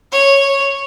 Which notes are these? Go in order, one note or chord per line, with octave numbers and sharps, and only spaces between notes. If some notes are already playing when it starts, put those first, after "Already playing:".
C#5